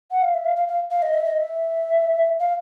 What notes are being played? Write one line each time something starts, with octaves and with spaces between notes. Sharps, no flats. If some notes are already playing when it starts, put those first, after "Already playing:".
F#5
F5
E5
F5
F5
F5
F5
D#5
E5
D#5
E5
F5